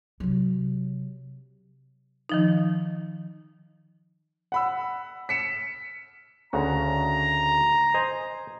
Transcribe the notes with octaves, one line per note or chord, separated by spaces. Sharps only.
C3 F#3
D#3 F3 D#4
F#5 B5 E6
B6 C#7 E7
D2 C#3 F#4 A#5
C5 D#5 G#5